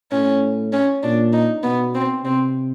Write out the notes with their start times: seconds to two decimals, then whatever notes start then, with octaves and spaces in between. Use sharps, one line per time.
0.12 A2 C#4
0.73 C#4
1.03 A#2 D4
1.33 D#4
1.63 B2 B3
1.95 C4
2.24 C3 C4